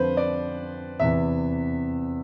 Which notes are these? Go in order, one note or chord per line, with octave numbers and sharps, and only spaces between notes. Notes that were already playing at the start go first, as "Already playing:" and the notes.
Already playing: F2 D3 F3 B4 C5
D5
E2 C3 E3 E5